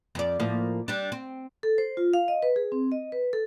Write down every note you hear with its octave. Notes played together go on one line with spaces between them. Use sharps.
F2 D5
A2 F3 A#3
G3 D4
C4
A4
C5
F4
F5
D#5
B4
G#4
C4
D#5
B4
A4